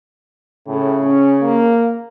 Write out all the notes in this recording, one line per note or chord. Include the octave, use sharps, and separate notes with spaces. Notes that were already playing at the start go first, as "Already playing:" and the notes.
A2 C#3
C#4
A#3